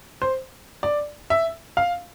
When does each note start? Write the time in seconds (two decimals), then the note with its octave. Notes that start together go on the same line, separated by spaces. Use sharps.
0.22 C5
0.83 D5
1.30 E5
1.77 F5